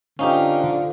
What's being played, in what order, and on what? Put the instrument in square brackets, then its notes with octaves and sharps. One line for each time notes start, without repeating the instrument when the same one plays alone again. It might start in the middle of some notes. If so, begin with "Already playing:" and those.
[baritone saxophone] D3 [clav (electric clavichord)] C#4 D#4 G4 [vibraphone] F4 C5 F5